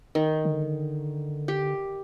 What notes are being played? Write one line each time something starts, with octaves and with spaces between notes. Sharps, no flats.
D#3
D3
G4